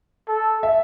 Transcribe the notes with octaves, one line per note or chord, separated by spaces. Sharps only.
A4
E5